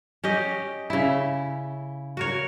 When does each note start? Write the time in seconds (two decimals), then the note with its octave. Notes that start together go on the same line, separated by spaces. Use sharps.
0.24 C#4 G4 D#5
0.90 C#3 E4
2.17 F#4 A#4 C#5